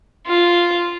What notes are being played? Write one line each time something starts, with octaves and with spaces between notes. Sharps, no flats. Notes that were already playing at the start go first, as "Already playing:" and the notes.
F4